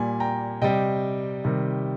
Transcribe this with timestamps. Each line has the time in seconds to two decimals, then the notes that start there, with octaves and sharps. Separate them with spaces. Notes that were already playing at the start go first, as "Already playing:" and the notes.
Already playing: A#2 G3 G#5
0.20 G5 A#5
0.62 C3 G3 D#5 G5
1.44 C3 D#3 G3